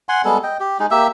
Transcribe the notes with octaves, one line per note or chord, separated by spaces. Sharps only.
F#5 G#5 C6
G3 G#3 B3 A4
D#5 G5
G4
G#3 D#4
A#3 G4 E5 E6